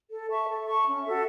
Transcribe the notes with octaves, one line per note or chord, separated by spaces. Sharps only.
A4
E5 A5 C#6
A4
E5 A5 C#6
C#4
F#4 A4 E5